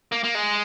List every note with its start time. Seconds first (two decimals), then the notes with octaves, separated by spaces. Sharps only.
0.12 A#3
0.24 A#3
0.35 G#3